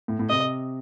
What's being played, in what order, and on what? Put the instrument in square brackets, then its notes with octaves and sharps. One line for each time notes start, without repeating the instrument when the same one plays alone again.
[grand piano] A2
A2
[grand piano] C3 [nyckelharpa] D#5